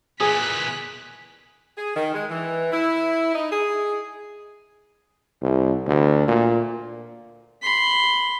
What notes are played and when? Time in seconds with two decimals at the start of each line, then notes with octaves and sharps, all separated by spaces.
0.20 A#2 E3 G#4 F#6 B6
1.77 G#4
1.96 D#3
2.14 G#3
2.31 E3
2.72 E4
3.35 D#4
3.51 G#4
5.42 C2
5.87 D2
6.28 A#2
7.63 B5 C6